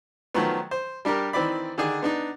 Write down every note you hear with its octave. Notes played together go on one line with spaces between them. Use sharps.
D#3 F3 F#3 A3 B3
C5
G3 D4 G4 A#4
D#3 E3 C4 D5 B5
D3 D#3 D4 G#4
B3 D4 D#4